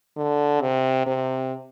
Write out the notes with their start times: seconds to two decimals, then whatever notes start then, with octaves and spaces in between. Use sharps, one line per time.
0.16 D3
0.61 C3
1.06 C3